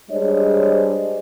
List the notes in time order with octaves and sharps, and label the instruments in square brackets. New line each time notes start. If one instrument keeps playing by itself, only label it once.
[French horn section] G3 G#3 D4 C5 C#5 D#5